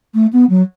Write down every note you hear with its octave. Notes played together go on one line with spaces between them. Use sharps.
A3
B3
F#3